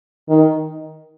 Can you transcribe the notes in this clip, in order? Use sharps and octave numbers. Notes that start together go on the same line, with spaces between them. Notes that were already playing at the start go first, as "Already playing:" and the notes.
D#3